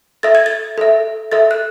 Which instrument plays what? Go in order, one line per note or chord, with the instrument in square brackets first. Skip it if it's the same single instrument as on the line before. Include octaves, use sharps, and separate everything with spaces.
[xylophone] A4 E5 A6
G#6
A6
A4 E5
A4 E5 A6
F#6